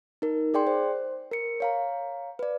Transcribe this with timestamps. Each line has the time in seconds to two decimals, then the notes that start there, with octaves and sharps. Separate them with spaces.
0.22 D#4 A#4
0.54 G#4 D5 G5 C6
0.67 C5
1.31 A#4 C#7
1.60 C#5 F5 A#5
2.39 B4 D5